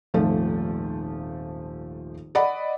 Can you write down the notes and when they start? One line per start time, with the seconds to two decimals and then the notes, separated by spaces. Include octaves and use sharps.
0.14 D#1 G#1 F3 A3 F4
2.35 D5 D#5 F#5 B5